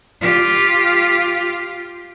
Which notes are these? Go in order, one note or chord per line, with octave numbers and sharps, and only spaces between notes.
F4 G4